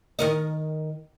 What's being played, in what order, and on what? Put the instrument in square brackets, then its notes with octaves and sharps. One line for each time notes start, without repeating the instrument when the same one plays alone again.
[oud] D#3 A#4 D#5